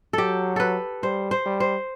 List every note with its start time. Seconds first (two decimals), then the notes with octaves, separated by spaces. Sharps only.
0.13 F#3 G4 A4
0.56 A4 B4
1.03 G3 C5
1.31 C5
1.46 G3
1.60 C5